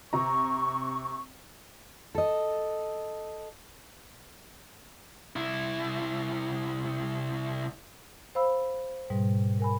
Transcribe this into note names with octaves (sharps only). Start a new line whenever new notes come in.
C3 A#5 C#6
A4 D#5
C2 E4
C5 F5 B5 E6
G#2 B2 G3
A#4 G#5 B5